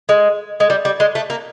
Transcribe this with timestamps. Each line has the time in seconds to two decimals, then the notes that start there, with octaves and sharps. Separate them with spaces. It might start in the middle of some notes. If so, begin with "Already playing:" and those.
0.09 G#3
0.60 G#3
0.70 G3
0.85 G3
1.00 G#3
1.15 A3
1.30 A#3